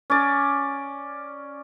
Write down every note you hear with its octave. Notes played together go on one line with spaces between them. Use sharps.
C#4 D5